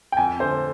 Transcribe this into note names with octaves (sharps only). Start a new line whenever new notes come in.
G5
F2 G#5
D3 C5